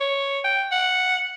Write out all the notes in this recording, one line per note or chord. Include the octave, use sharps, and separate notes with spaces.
C#5
G5
F#5